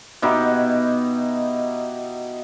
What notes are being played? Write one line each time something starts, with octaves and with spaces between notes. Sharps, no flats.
B2 D#4 E4 G4